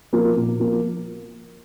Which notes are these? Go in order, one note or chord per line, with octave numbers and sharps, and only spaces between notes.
F3 A#3
A#2
F3 A#3